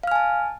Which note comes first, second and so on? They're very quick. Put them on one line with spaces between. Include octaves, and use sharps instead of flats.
F5 F6 G#5 A5